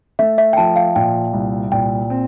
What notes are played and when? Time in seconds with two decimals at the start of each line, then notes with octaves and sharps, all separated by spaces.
0.19 A3 E5
0.38 E5
0.53 G5
0.57 F3 A5
0.76 F5
0.96 A#2 G5
1.33 C2
1.72 A#2 G5
2.10 C4